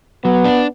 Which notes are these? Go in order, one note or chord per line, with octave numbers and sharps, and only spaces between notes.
F#3 B3
D4